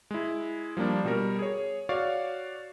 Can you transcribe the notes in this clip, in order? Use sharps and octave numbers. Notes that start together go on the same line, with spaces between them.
G#3 E4
F3 G3 A#3 D4
B2 G3 A#4
G#4 C#5
F#4 C#5 D5 F5 C#6